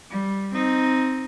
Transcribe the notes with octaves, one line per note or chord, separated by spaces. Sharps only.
G3
C4 D#4